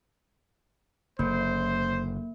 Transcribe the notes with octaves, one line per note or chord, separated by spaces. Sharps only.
F#1 D3 A#3 C5